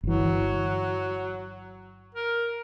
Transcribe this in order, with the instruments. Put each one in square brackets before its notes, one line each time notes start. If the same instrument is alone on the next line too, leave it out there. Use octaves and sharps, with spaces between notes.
[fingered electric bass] G1 E3 [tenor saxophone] F#3
[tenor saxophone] A#4